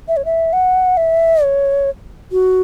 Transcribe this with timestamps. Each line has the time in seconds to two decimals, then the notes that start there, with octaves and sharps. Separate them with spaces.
0.08 E5
0.17 C#5
0.25 E5
0.53 F#5
0.97 E5
1.43 C#5
2.32 F#4